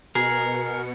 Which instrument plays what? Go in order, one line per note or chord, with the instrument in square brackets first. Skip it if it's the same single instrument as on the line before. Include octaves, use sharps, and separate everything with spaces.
[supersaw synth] B2 C#7 [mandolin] G#4 [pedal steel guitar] A#4